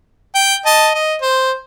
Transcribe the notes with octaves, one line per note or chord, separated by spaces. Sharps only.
G5
D#5 A5
D#5
C5